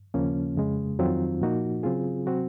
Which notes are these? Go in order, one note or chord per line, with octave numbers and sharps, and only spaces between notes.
D#2 C#3 F3 A#3 C#4
F2 C#3 G#3
F2 D#3 F#3 C4 F4
A#2 F3 A#3 D#4 F#4
C#3 F#3 C4 F4 G#4
C3 F#3 C4 F#4